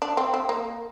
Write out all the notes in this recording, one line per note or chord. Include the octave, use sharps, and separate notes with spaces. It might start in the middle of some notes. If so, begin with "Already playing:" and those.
D4
C4
C4
A#3